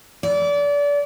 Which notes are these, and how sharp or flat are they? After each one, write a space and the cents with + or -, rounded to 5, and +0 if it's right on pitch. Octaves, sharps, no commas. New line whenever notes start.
D5 -30